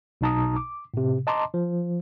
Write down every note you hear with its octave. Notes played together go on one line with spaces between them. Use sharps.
B1 B2 D#4 A5 A#5 D#6
D6
A2 C3
D#5 A5 A#5 C6 D6
F3